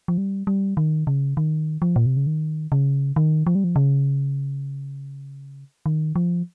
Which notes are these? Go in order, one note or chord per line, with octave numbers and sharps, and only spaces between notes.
F3
G3
G3
D#3
C#3
D#3
F3
A#2
C3
C#3
D#3
C#3
D#3
F3
G3
F3
C#3
D#3
F3